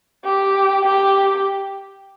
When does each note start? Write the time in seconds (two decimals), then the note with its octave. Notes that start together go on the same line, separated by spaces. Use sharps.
0.25 G4
0.85 G4